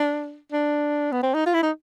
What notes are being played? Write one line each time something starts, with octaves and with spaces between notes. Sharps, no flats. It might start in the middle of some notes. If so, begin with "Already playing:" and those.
Already playing: D4
D4
B3
C4
D#4
F4
E4
D#4